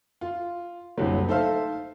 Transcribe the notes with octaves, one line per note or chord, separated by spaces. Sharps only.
F4
F#1 C2 D3 F#3
A3 D#4 A4 C5 E5 F5